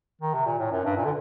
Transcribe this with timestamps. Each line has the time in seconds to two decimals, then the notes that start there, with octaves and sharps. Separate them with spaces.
0.21 D#3
0.34 C3
0.46 A#2
0.59 A2
0.72 F#2
0.85 G2
0.97 A#2
1.05 D3